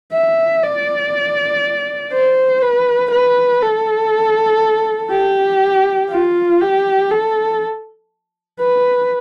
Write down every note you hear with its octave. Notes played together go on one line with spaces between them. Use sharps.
E5
D5
C5
B4
B4
A4
G4
F4
G4
A4
B4